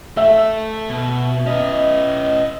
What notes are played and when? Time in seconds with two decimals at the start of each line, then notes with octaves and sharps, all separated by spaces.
0.17 A3 A4 E5
0.89 B2
1.46 C#4 B4 D#5